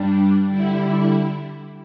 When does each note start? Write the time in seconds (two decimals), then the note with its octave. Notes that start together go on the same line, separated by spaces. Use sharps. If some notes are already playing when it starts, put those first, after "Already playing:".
Already playing: G2 G3 D4
0.48 D3 G3 E4